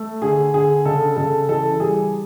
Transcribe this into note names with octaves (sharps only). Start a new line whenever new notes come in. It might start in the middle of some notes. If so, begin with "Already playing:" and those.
Already playing: A3
D3 G#4
D3 G#4
C#3 A4
C#3 A4
E3 A4
G3 G#4